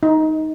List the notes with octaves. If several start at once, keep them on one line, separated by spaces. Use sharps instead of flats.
D#4